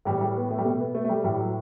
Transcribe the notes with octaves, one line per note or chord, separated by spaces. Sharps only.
A2 E3 G3
G3
B3
A3
G3
B2 A3
B3
A3
A3
G3
A2 E3 G3
F#3